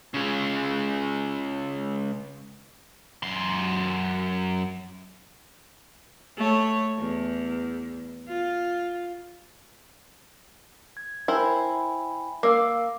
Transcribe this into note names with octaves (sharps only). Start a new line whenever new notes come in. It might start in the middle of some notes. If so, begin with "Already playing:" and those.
C#3 G#3
F#2 C6
A3 C#5
E2
F4
G#6
E4 A#4 C5 G5 G#5 B5
A#3 F5 D6 E6